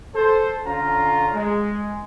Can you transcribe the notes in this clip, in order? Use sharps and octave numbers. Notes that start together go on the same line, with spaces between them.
A4 C5
D3 C#4 F4 A#5
G#3